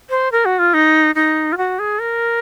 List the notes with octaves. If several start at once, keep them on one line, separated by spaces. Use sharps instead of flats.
C5
A#4
F#4
F4
D#4
D#4
F4
F#4
G#4
A#4